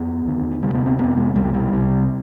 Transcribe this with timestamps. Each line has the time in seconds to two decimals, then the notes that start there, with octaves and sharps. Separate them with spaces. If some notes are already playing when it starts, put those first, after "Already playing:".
Already playing: F2 B3
0.25 D#2 D3
0.63 D2 C3 G3
0.74 B3
0.86 C4
0.98 F2 C3 B3
1.17 G#3
1.35 C2 B2 G3
1.54 G3
1.72 C2 C3